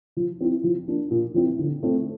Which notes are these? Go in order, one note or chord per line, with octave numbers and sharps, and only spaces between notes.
F3
C4 E4
F3
A#3 D4
A#2
F3 C4 E4
D3
A3 C4